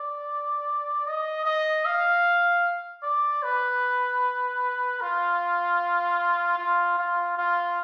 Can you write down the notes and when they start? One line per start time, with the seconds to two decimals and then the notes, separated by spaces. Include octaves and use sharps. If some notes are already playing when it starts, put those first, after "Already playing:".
Already playing: D5
1.07 D#5
1.46 D#5
1.85 F5
3.03 D5
3.43 B4
5.01 F4
6.58 F4
6.98 F4
7.38 F4